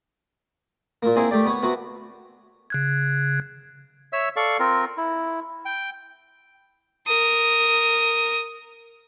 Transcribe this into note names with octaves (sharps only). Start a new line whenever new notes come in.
A#2 A#3
A#3 C4 E4 G#4
A3 G4 D5
B3 C#5
C3 B3 F#4
C#3 F#6 G#6
C#5 E5 E6
A4 D5 F5 C#6
C4 F4 A#4
E4
G5
A#4 D#6